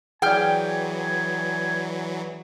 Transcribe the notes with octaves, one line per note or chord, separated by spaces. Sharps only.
E3 F#3 G#4 D5 G5 G#5 F6